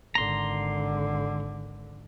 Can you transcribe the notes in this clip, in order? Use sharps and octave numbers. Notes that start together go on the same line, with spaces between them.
G#1 D3 A#5 C6